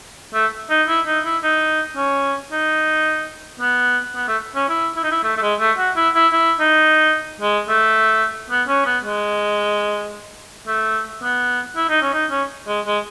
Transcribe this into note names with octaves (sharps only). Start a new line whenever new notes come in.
A3
D#4
E4
D#4
E4
D#4
C#4
D#4
B3
B3
A3
C#4
E4
E4
D#4
E4
A3
A3
G#3
A3
F#4
E4
E4
E4
D#4
G#3
A3
B3
C#4
B3
G#3
A3
B3
E4
D#4
C#4
D#4
C#4
G#3
G#3